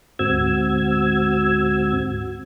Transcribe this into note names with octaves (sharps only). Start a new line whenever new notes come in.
D2 G#2 C4 F#4 E6 G#6